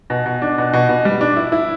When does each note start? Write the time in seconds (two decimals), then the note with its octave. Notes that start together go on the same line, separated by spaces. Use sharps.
0.10 B2
0.26 B2
0.42 D4
0.58 B2
0.73 B2
0.89 B2
1.05 G3
1.21 D4
1.36 E4
1.52 E4